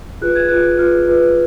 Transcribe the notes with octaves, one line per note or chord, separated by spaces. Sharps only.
F4 G#4 B4 F#6
G#6
F4 G#4 B4 F#6
F4 G#4 B4 F6
F4 G#4 B4